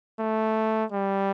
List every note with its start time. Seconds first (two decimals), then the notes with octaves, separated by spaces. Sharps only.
0.19 A3
0.92 G3